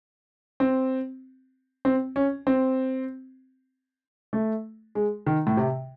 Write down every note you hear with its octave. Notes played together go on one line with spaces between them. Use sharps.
C4
C4
C#4
C4
A3
G#3
D#3
A2
C3